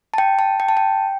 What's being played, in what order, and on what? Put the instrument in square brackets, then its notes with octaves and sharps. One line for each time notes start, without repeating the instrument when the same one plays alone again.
[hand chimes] A5
G5
A5
G5
A5
G5